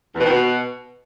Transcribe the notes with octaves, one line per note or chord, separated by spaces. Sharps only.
E2
B2
D#3
B2